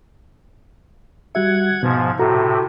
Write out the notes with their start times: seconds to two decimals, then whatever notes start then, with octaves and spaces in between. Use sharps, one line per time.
1.35 G3 F#4 E5 F#5 G#6
1.83 G#2 B2 F3
2.19 A2 C3 F#4 A4 A#5